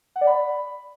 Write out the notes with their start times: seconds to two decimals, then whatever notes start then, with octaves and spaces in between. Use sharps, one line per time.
0.16 F#5
0.21 D5
0.27 B5